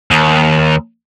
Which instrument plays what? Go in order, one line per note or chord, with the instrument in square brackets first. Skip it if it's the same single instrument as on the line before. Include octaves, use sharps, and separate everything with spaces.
[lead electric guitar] D#2